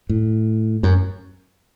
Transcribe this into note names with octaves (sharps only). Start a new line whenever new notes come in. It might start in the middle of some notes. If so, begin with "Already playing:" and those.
A2
F#2